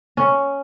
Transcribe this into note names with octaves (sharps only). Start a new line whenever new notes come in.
C#4